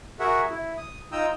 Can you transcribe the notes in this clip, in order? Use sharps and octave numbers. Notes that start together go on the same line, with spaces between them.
F#4 G#4 A#4 E5 F#5
E4
D#6
D#4 F4 G5 A#5 D#6 E6